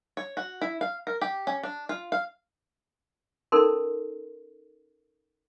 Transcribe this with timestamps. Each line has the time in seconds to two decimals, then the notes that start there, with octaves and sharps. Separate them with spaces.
0.17 C#5
0.37 F#4
0.61 E4
0.81 F5
1.07 A#4
1.21 G4
1.47 C#4
1.63 D4
1.89 F4
2.12 F5
3.52 C#4 D#4 A4 A#4 C6